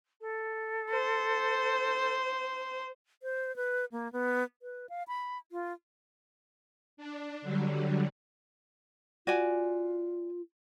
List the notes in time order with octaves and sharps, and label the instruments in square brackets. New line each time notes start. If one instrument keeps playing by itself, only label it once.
[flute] A4
[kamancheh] C5
[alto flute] C5
B4
A#3
B3
B4
F5
B5
F4
[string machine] D4
D3 F#3 G3
[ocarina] F4 [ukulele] F#4 D5 G#5